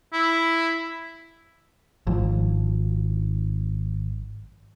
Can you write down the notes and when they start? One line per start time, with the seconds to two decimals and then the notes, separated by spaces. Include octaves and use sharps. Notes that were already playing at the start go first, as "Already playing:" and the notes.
0.13 E4
2.07 G#1 F3